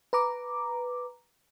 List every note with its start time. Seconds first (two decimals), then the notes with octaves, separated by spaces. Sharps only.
0.13 B4 A#5 D6